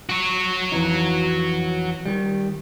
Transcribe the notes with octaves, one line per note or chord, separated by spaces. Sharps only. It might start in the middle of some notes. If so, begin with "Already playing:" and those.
F#4 C#5
F2 E3 D#4
D#3 G3